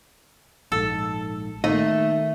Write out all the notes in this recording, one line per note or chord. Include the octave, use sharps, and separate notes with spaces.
A#1 G#2 A4
D#3 A3 A#3 D#4 D#5